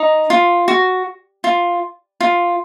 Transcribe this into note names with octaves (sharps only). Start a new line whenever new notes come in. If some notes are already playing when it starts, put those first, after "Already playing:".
Already playing: D#4
F4
F#4
F4
F4